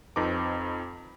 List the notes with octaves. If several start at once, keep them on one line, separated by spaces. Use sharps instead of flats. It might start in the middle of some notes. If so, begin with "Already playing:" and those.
F2 C4 D#4 B4 A#5 D6